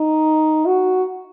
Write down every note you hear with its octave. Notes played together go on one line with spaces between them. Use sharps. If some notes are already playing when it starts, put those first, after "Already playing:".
Already playing: D#4
F#4